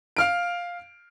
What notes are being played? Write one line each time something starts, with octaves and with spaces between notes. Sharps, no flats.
F5 F6 D7